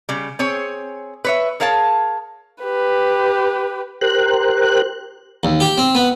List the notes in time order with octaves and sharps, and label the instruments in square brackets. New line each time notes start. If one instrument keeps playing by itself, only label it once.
[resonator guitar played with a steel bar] C#3 G3
C4 G#4 C#5
B4 C#5 E5
G#4 A#4 C#5 F5 A5
[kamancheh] G4 B4
[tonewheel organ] G4 A#4 C5 F#6
[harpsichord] D#2
G4
C4
B3